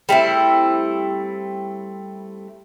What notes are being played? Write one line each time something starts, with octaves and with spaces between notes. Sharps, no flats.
G3 A3 C4 E4